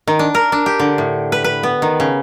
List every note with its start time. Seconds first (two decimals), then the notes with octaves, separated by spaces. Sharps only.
0.07 D#3
0.19 D4
0.35 A#4
0.52 D4
0.66 G4
0.80 D3
0.98 A2
1.32 B4
1.44 B4
1.63 B3
1.82 D#3
2.00 C#3